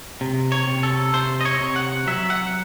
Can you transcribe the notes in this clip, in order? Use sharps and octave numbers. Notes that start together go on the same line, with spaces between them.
C3
C#5
C3
A4
C3 C5
D#5
C#5
C3
F#5
F#3 E5
F#5